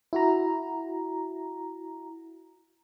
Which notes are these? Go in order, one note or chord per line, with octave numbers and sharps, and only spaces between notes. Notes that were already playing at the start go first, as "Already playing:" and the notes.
E4 F#4 A#5